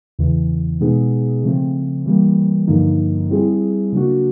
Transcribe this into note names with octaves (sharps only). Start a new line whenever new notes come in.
E2 C#3 E3
B2 G#3 B3 D#4 G#4
C#3 F3 A3 C4
E3 G3 A#3
G2 D3 F3 A#3 D#4
G3 C4 E4 G#4
C#3 F#3 A#3 D4 F#4